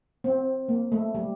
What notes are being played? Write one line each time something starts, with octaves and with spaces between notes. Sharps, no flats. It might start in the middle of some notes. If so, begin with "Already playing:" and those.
C4
A#3
A3
G3